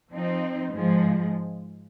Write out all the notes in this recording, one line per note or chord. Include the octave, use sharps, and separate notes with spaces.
F3 C4 D#4
G#2 F3 G#3